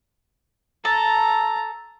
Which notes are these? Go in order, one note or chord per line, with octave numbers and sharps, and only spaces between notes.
A4 A#5